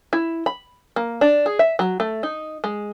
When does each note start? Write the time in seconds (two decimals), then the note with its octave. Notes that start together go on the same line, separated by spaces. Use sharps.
0.13 E4
0.46 B5
0.96 A#3
1.21 D4
1.46 G#4
1.59 E5
1.79 F#3
2.00 A3
2.23 D#4
2.64 G#3